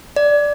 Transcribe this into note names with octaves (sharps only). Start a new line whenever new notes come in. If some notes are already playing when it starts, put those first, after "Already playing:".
D5